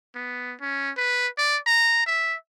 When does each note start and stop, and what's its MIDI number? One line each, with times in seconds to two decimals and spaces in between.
0.15 0.55 59
0.61 0.91 61
0.97 1.28 71
1.38 1.57 74
1.67 2.05 82
2.07 2.36 76